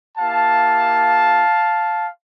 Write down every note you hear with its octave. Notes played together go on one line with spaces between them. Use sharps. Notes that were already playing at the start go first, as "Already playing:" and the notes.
A#3 E4 G4 F5 A5